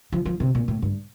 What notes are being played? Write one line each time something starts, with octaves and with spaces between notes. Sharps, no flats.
F3
F3
C3
A#2
A2
G2